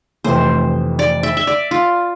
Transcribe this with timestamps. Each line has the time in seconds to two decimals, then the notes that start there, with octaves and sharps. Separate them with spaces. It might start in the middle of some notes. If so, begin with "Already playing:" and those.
0.24 F1 F2 C3 E3 A3 C5
0.99 D5
1.23 E5
1.37 E5
1.47 D5
1.71 F4